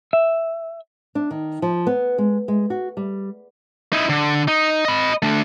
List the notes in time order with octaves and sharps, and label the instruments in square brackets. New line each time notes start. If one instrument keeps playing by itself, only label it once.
[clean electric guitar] E5
[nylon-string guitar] D4
D#3
F3
B3
G#3
G#3
F#4
G3
[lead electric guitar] D#4 E4
D3
D#4
D#5 B5
A3 D4